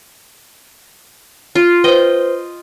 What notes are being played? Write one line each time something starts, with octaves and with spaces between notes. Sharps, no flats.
F4
B4 C5 D#5 G5